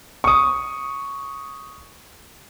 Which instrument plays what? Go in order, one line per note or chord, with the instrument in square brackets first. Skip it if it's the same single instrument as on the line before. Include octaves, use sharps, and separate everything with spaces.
[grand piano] C#6 D#6